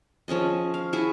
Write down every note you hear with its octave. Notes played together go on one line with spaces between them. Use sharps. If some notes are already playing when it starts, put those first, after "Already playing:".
F3 C#4 G#4 D#5
F5
E4 F#4 G#4